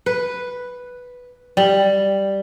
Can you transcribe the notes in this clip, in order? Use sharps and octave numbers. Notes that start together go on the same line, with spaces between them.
B4
G3